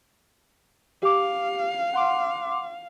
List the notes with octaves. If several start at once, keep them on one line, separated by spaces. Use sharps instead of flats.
G4 F5 D6
F#5 C6 D6